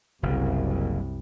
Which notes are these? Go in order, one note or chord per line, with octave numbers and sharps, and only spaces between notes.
F#1 C2 F#2